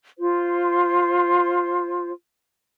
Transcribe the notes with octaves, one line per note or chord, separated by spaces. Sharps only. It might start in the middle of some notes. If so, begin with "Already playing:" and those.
F4 C5